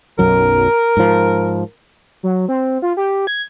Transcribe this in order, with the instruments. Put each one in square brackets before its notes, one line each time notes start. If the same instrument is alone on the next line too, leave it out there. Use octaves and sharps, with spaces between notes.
[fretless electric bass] B1 F#2 F#3 [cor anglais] A#4
[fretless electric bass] G#2 F3
[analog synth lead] F#3
C4
F4
G4
G#6